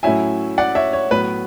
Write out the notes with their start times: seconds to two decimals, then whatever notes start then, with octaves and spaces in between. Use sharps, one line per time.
0.03 A2 F#3 C#4 E4 E5 G#5
0.58 D5 F#5
0.75 C#5 E5
0.93 C#5
1.11 A2 F#3 B3 B4